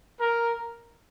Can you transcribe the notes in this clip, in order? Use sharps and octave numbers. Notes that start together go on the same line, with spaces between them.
A#4